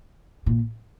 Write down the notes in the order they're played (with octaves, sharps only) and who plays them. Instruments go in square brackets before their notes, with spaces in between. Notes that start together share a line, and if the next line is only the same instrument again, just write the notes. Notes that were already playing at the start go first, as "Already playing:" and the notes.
[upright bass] A#2